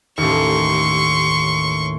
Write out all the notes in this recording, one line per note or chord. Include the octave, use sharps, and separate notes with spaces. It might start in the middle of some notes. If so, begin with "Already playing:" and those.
A1 D#2 C6 C#6